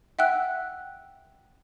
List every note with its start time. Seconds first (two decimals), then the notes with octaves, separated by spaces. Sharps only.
0.19 E5 F#5 G5 E6 F#6